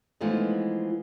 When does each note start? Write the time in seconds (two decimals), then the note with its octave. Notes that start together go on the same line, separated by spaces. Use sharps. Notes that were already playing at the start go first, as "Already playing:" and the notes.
0.21 E3 F3 G#3 A3 B3 D#4